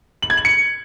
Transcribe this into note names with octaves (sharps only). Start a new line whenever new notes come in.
F#7
G#6
F#7
C#7